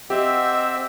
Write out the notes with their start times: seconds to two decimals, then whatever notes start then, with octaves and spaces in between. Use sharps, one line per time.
0.10 C4 G4 D#5 E5 F#5 G5